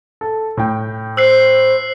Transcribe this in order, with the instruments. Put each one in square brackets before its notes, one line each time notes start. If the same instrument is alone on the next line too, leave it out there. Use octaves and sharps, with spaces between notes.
[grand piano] A4
A2 G5
[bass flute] C5 [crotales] E6 F#6 C7